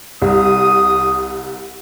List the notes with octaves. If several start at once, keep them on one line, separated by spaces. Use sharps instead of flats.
C2 D#6